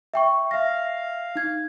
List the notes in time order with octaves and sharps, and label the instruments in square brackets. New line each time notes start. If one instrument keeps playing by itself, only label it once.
[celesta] E5 G5 C#6
[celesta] E5 A#6 [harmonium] F5
[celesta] D#4 G#6